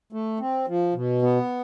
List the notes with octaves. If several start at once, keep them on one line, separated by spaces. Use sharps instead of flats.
A3
C4
F3
B2
B3